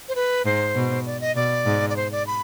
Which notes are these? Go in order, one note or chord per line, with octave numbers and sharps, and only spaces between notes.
C5
B4
G#2 C5
B2
D5
D#5
B2 D5
G#2
D5
C5
D5
B5